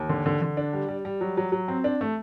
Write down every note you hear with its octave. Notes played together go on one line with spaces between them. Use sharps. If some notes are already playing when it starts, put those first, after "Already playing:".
Already playing: D#2
D3
D3
D3
D4
G3
G3
G3
F#3
F#3
F#3
C4
D4
A3